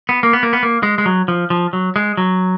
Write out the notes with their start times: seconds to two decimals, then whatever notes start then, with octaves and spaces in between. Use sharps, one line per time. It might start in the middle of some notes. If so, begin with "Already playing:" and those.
0.09 B3
0.23 A#3
0.33 B3
0.43 A#3
0.53 B3
0.63 A#3
0.83 G#3
0.98 G#3
1.06 F#3
1.28 F3
1.50 F3
1.73 F#3
1.96 G#3
2.17 F#3